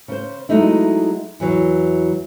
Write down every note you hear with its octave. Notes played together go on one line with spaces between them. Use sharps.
C#3 C5
F#3 G#3 A3 D#4 E4
E2 E3 F#3